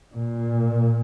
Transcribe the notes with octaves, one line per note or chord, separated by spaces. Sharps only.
A#2